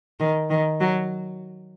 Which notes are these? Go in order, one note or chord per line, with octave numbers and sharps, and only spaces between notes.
D#3
D#3
F#3